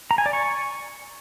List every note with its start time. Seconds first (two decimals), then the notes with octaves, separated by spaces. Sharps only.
0.11 A#5
0.18 G#5
0.26 D5
0.33 C#6